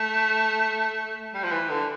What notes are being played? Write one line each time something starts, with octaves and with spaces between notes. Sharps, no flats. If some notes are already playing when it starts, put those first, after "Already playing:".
Already playing: A3
G3
F3
E3
D3